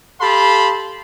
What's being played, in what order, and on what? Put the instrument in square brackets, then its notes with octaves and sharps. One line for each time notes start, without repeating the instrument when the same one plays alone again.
[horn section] G4 A4 F5 A5 B5 C6